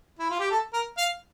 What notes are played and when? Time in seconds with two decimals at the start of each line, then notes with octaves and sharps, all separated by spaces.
0.19 E4
0.30 F4
0.40 G4
0.51 A4
0.73 A#4
0.98 F5